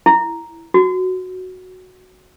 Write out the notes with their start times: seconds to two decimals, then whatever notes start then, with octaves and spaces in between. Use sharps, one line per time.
0.06 E4
0.74 F#4